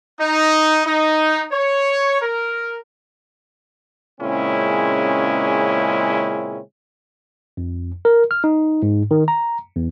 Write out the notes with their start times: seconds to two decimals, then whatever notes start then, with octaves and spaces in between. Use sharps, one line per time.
0.20 D#4
0.86 D#4
1.52 C#5
2.21 A#4
4.20 A#2 C#3 G#3 C4 C#4 E4
7.57 F2
8.05 A#4
8.31 F6
8.44 D#4
8.82 G#2
9.11 D#3
9.28 A#5
9.76 E2